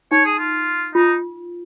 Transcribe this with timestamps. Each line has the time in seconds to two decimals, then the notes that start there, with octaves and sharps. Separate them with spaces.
0.11 D#4 C#5
0.25 G#4
0.39 F4
0.95 D#4 F4